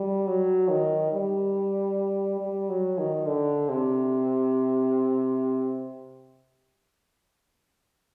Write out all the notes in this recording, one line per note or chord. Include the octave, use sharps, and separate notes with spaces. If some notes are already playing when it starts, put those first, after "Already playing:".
Already playing: G3
F#3
D#3
G3
G3
F#3
D#3
D3
C3